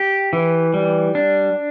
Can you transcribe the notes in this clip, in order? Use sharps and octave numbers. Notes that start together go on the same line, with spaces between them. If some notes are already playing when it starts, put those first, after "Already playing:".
Already playing: G4
E3
G3
D4